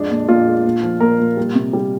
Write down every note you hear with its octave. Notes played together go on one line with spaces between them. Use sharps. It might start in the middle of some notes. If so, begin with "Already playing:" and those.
Already playing: F2 G#3 D4
A#2
A#2 F4
G#3
A#2
F3
A#2 A#4
A#2
G3
C3
G3